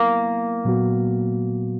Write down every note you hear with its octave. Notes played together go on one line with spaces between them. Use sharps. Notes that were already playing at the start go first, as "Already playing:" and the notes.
Already playing: F#3 A#3 B3 E4 A#4
A#2 F#3 B3 F#4